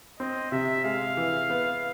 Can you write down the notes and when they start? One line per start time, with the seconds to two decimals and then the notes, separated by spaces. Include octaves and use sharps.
0.19 C4 D#5
0.52 C3 E5
0.85 G#3 F5
1.17 E3
1.50 B3